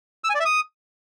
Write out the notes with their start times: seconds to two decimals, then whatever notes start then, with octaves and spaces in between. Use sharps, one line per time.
0.24 E6
0.29 G#5
0.35 D5
0.40 E5
0.45 D#6